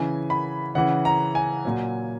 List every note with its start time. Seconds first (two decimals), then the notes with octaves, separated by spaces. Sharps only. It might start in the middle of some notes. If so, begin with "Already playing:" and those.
Already playing: C#3 E3 G#5
0.30 B5
0.75 C#3 E3 F#5
1.05 A#5
1.35 G#5
1.65 A#2 F#3